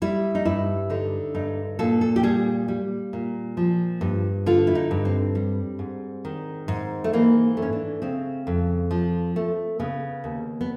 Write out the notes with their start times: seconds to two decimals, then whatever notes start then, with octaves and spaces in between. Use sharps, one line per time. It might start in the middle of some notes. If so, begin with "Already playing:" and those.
0.02 G3 E4
0.35 D#4
0.45 G2 E4
0.90 D3 D#4
1.35 G2 D#4
1.79 A#2 A4
2.01 A4
2.16 G4
2.23 G3 G#4
2.68 G3
3.13 A#2
3.57 F3
4.01 G2
4.46 D3 F4
4.67 E4
4.75 D#4
4.91 G2
5.05 C4
5.35 G3
5.79 G#2
6.25 D#3
6.68 G#2
7.04 A3
7.13 E3 A#3
7.57 A3
7.62 C#4
7.73 D4
8.02 C#3 C4
8.47 F2
8.91 F3
9.36 A3
9.80 C#3 B3
10.24 D#2
10.61 B3